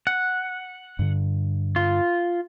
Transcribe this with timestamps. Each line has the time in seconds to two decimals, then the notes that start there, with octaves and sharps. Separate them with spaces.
0.07 F#5
0.99 G2 D3
1.76 F4